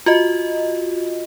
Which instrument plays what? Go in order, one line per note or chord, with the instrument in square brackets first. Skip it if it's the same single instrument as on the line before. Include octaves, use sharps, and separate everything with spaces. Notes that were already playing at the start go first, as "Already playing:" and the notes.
[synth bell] F4 F#4 D#5